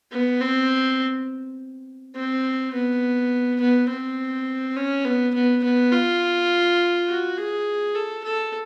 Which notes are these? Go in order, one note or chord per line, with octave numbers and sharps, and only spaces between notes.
B3
C4
C4
B3
B3
C4
C#4
B3
B3
B3
F4
F#4
G#4
A4
A4